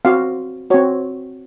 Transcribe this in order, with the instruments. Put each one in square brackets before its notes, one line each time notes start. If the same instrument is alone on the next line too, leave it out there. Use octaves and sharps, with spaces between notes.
[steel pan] C4 F#4 F5
C4 F#4 C#5